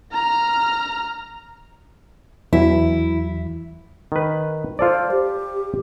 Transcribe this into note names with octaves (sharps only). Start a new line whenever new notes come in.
A#5 F6
E2 E3 F#3 E4
D#3 B4
F4 A4 C5 D5
G4